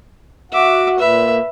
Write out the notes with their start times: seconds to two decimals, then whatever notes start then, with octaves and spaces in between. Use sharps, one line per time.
0.52 F#4 E5 D6
0.99 A#2 B4 E5